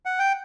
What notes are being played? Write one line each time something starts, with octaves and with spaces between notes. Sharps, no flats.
F#5
G5